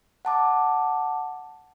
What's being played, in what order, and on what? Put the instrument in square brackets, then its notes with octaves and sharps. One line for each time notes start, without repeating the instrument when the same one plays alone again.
[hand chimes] F#5 A5 D6